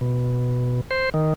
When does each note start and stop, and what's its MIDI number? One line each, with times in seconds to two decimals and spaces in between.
0.01 0.81 47
0.91 1.09 72
1.14 1.33 51